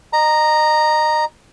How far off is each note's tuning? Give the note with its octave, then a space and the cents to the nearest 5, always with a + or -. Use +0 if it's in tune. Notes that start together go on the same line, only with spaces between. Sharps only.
D#5 -30 A#5 +0